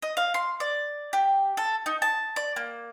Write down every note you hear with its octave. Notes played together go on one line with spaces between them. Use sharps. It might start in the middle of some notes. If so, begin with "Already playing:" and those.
D#5
F5
C6
D5
G4
A4
D#4
A5
D5
A#3